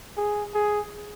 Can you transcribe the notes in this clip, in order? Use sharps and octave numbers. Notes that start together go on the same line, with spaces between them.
G#4
G#4